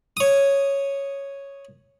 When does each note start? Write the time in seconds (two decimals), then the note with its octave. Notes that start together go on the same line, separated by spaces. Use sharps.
0.17 C#5 D#6